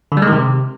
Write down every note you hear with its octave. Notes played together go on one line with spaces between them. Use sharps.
D3
G3
G#3
D#3
C3